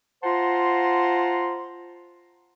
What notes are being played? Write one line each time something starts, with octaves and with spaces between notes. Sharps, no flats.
F4 C5 F#5 A5 A#5 C6